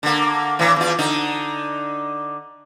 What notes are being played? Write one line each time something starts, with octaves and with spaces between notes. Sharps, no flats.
D3 A#3
A2 E3
E2 F4
D3 D#4